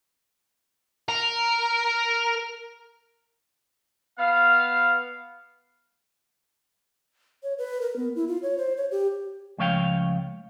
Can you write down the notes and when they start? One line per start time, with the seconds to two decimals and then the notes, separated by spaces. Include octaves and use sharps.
1.09 A#4
4.19 B3 F5
7.43 C#5
7.58 B4
7.81 A#4
7.96 B3
8.15 E4
8.28 F4
8.43 C#5
8.58 C5
8.77 C#5
8.91 G4
9.58 C#2 F3 A3 C#5 F5 G5